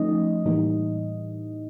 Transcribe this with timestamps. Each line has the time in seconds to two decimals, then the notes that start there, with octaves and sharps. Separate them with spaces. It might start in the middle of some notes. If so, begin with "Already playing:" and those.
Already playing: F3 A3 C#4 D#4 D#5
0.45 A2 E3 G3 A#3 D#4